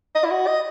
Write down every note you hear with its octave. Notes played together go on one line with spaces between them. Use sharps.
D#5
E4
F#4
D#5